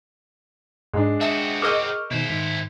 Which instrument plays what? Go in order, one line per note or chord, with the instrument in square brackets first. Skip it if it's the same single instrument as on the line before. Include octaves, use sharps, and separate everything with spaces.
[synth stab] G#2 [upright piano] G#3 D4
[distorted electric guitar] C4 F#4 [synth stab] E5 [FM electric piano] A5 D#6
[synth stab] G#4 A#4 D#5 [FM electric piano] C#6 F6 [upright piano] D6 E6 G6
[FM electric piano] B2 D#3 [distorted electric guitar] E4 C5
[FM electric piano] G#2 D#3 B6